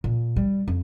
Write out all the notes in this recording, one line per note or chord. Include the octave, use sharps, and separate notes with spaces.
A#2
G3
F2